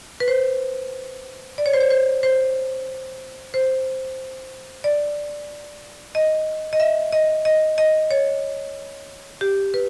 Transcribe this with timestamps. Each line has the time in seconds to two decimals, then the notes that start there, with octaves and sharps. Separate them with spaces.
0.20 B4
0.28 C5
1.58 D5
1.66 C#5
1.73 C5
1.80 C#5
1.90 C5
2.23 C5
3.54 C5
4.84 D5
6.15 D#5
6.73 D#5
6.80 E5
7.12 D#5
7.45 D#5
7.78 D#5
8.11 C#5
9.41 G4
9.74 B4